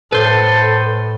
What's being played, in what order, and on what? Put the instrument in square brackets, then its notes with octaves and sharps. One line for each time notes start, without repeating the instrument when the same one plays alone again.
[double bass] A2 [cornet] A4 [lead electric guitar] B4 C5